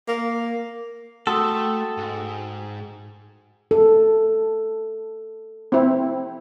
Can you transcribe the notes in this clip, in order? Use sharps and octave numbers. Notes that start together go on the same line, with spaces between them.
A#3
A3 F#4 A4 F#5 G5 C6 D#6 E6
G#2
A4
C4 E4